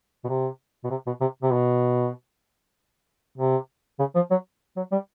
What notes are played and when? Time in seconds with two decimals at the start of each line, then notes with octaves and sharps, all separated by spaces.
0.24 B2
0.29 C3
0.84 B2
0.90 C3
1.06 B2
1.21 C3
1.42 C3
1.53 B2
3.38 C3
3.99 C#3
4.15 F3
4.31 F#3
4.76 F#3
4.92 G3